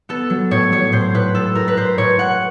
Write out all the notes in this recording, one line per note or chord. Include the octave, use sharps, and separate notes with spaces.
B3 A4
F#3
A2 C#5
F#3 C#5
A2 C5
A2 B4
A2 A4
A2 A#4
B4
A2 C5
A2 C#5
A2 F#5